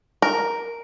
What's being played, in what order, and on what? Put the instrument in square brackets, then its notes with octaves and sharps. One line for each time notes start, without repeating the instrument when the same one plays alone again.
[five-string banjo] A#4